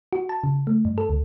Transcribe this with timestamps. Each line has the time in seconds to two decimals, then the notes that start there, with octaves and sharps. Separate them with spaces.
0.13 F#4
0.29 A5
0.44 C#3
0.67 A3
0.85 G2
0.98 A4
1.09 D2